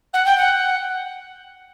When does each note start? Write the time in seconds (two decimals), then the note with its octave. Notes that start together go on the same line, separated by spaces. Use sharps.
0.13 F#5
0.25 G5
0.37 F#5